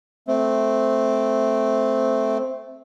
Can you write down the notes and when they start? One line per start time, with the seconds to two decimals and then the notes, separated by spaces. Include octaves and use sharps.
0.28 A3 C4